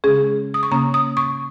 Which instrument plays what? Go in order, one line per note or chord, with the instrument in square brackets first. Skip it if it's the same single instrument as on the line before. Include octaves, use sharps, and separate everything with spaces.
[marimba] C#3 G#3 C#4 G#4
D#6
C#6
C#3 A#3 C#4 A#5
D#6
C#6